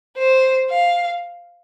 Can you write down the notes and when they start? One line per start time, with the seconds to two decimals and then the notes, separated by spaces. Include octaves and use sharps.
0.17 C5
0.70 F5